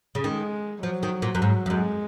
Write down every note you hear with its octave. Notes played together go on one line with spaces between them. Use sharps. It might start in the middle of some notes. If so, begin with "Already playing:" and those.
C#3
D#3 G#3
F3 F#3
D#3
A#2
F#2
G#2 F#3
F2
F#2 G#3